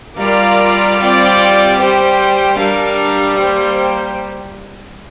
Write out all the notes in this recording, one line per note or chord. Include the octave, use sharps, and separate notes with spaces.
G3 F4 A#4 D5 F5
C4 F4 D5 G5
G4 C5 G5
G3 D4 A#4 F5
A#3 G4 C5 G5